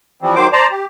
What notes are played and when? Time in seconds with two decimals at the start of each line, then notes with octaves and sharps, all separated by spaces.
0.22 E3 F3 G3 C4
0.35 G#2 D#3 F#3 C5 D6
0.52 C5 D5 A5 A#5
0.71 G4